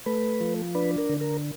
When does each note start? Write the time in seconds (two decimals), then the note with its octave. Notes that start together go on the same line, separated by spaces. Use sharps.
0.06 A3 B4
0.41 F3
0.75 D4 B4
0.98 A#4
1.10 D3
1.21 A#4